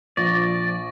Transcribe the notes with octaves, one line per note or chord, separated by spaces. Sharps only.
A#1 F3 D5 C#6 A6 A#6